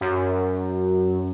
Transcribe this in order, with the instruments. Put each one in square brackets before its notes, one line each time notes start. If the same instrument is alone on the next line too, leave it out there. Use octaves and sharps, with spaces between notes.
[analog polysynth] F#2